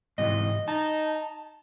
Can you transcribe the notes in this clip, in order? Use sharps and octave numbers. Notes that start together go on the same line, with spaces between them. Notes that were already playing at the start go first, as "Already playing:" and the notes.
G#2 C3 E3 D#5
D#4 A5